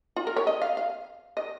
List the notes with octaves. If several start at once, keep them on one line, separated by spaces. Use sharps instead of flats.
F4
A#4
C#5
D#5
F5
F5
D#5